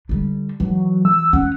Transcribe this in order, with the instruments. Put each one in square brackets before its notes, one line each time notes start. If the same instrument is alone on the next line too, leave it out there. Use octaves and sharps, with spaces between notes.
[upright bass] D3 G3
[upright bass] E3 [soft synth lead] F#3
[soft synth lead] E6
[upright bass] C#4 [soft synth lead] F#5